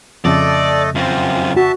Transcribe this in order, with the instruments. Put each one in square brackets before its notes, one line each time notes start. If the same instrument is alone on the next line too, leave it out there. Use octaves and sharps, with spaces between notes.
[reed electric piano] F2 C#3 [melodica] A3 A4 D#5 [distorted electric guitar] D5
[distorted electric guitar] F#2 C4 [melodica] F4
[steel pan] F#4 [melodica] E5 A5